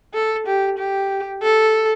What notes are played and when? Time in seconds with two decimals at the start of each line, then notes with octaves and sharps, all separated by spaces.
0.14 A4
0.46 G4
0.78 G4
1.43 A4